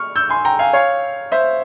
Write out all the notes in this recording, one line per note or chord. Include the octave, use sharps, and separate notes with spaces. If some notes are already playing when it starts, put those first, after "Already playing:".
Already playing: C#6 F6
E6 G6
G#5 C6
G5 A#5
F5 G#5
C#5 F5
C5 E5